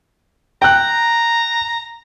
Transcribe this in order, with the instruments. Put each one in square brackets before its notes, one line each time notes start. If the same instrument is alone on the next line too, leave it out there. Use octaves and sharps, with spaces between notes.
[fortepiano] G5 F#6 [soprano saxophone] A#5